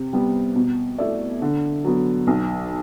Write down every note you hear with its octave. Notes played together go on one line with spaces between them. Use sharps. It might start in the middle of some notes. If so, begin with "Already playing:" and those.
Already playing: C3
G3 B3
B2
A3 E4 A4 D5
D3
F#3 B3
B1